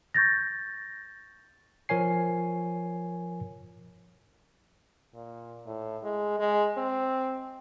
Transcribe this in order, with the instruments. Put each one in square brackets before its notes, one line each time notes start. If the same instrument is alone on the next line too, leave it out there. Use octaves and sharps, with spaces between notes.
[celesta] C#6 G6 A6 A#6
[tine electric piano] F3 A#4 C#5 G#5 C7
[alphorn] A#2
A2
G#3
G#3
C4